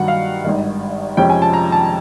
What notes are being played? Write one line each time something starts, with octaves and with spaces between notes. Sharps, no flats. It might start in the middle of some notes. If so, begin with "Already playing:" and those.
Already playing: G2 D#3 F#3 F#5
F5
G#1 G2 D#3
F2 C3 F3 G#3 C#4 G5
G#5
A5
A#5
A5